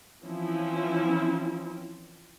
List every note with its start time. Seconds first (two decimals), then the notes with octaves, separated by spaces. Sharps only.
0.22 E3 F3 C4 C#4 E4